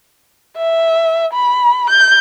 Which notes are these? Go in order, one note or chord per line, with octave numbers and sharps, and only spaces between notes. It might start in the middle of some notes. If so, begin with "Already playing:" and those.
E5
B5
G6